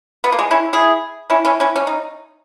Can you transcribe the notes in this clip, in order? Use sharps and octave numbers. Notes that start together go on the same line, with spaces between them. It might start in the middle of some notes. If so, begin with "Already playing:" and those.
B3
A#3
G#3
C#4 E4
E4 G#4
C#4 E4
C#4 E4
C#4 E4
C#4
D#4